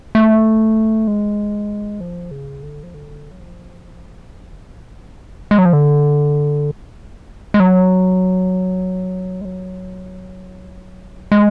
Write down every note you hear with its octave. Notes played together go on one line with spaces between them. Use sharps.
A3
G#3
F3
C#3
D3
F3
D3
F#3
F3
G#3
F#3
F3
D3
G#3
F#3
G#3
F#3
G#3